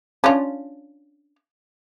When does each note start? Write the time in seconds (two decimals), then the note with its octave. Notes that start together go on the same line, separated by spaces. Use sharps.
0.24 C#4 D4 F4